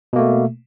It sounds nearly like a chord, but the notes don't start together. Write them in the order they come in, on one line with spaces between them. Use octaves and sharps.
B2 A#3 A3